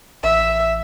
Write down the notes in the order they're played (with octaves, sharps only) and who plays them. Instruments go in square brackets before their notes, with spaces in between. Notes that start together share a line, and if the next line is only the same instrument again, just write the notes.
[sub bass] A1 [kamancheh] E5